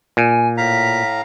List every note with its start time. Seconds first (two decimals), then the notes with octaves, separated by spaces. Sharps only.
0.17 A#2 G#5
0.57 A2 F5 A#5 B6